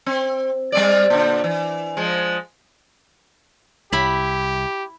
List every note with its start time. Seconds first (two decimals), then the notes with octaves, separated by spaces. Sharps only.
0.06 C4
0.72 G3 C4 D5
1.10 A#2 D3
1.44 E3
1.97 F3 G#3
3.92 C2 E4 G4 B5